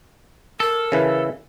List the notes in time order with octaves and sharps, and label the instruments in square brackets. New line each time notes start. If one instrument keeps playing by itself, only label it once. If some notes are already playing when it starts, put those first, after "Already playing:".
[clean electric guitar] A4 [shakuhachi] A#4
[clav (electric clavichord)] C#3 E3 B4